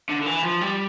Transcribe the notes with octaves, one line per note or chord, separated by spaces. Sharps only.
D3
D3
E3
F3
G3